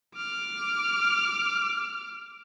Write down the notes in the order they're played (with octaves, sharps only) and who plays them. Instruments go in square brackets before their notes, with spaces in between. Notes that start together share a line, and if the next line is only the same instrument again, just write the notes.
[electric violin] D6 F6